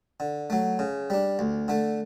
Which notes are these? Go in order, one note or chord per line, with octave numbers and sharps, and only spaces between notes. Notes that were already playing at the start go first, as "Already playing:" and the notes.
D3
F#3 A3
C#3
G3 D4
D2
D3 A3